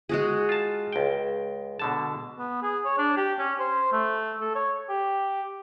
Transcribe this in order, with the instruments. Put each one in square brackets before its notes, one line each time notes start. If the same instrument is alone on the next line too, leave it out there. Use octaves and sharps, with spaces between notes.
[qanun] G#3 F#4 G#4
[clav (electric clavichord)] F4 A5
C#2 G5
B2 D3 A5
[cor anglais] B3
G#4
C#5
D4
G4
C#4
C5
A3
A4
C#5
G4